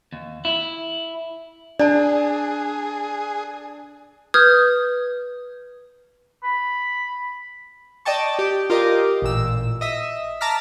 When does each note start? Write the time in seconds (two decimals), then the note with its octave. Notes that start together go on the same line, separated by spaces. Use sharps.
0.12 D#2
0.45 E4
1.79 D4 G#4 D5 A5
4.34 B4 D#6 F6 G6 G#6
6.43 B5
8.05 D5 D#5 G5 A5 C#6
8.39 G4 D5
8.70 F4 G4 A#4 D#5 D6
9.22 A1 A#2 E6
9.81 D#5 E5
10.41 A5 A#5 D6 F6 B6